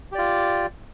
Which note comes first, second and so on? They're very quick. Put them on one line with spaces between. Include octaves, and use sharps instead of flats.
G4 D5 F4